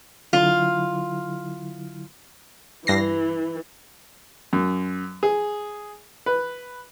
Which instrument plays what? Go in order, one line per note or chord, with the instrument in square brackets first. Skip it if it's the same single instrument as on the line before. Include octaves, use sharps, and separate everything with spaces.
[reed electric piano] D3 F#3 E4 [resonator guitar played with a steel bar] F4
[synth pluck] G2 A#6 C7 [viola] E3
[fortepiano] F#2
G#4
B4